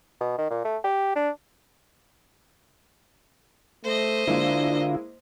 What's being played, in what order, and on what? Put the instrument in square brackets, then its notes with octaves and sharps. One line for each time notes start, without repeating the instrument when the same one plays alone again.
[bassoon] B2
D#3
A#2
A3
G4
D4
[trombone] A3 [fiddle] C5 D#5
[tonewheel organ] D3 F4 [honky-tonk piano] G#3 A#3 E4 [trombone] D4